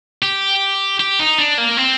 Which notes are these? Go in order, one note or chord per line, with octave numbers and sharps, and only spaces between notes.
G4
G4
D#4
D4
A#3
C4